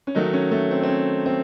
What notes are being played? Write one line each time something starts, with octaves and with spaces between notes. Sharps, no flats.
C#4
D#3 F#3 A3 D#4
C#4
A3
C4
C4
C#4
C4